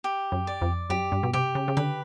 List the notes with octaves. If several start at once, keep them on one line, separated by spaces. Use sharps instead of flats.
G4
F#2
D5
F2
F#2 G4
G2
B2
C3 G4
C#3
C#3
D3 B4